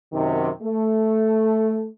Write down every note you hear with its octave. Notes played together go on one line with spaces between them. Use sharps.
F#2 C3 D#3
A3